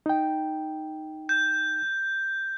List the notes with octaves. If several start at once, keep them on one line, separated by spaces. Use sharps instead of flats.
D#4 G5
G6